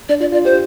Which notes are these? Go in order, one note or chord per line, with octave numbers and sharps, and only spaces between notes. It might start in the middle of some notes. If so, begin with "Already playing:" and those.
D4 D5
F4 D5
F4 D5
G4 C5